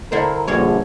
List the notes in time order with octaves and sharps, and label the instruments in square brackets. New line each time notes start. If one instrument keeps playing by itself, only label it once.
[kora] D3 E4 C5 [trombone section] A#4
[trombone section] A#1 D3 [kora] G2 C#4 C#5